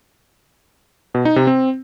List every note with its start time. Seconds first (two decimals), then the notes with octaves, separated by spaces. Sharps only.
1.15 B2
1.25 D#4
1.36 C3
1.47 C4